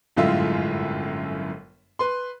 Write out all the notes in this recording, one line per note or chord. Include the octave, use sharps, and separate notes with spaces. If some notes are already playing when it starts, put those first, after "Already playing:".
G1 F#2 A2 G#3 F4 E5
B4 C6